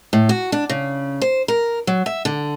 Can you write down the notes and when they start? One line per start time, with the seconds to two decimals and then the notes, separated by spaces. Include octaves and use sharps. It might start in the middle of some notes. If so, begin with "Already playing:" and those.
0.13 A2
0.29 F#4
0.52 D4
0.70 C#3
1.22 C5
1.48 A#4
1.87 F#3
2.06 E5
2.25 D3